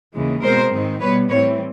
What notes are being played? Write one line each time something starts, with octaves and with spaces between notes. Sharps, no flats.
D#2 C#3 E3 G#3
B2 G#3 C4 A#4 C5
G#2 D#3 G#3 C4
B2 G3 B3 B4 C#5
A2 E3 G3 C4 B4 C#5